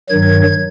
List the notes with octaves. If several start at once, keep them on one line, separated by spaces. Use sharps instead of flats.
G2 D#3 F#3 G#6